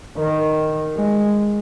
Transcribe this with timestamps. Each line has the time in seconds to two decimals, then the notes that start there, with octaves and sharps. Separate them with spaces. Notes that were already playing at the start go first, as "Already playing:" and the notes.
0.17 D#3
0.96 G#3